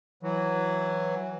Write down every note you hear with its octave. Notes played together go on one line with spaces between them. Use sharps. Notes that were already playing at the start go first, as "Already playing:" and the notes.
E3 F#3